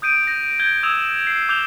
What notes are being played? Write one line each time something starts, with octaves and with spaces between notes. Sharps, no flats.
D#6 G6 D7 D#7
G6 A#6
G6 G#6 G7
D#6 E6 G#6 E7 F7
C7
D6 G6 E7 F7 G7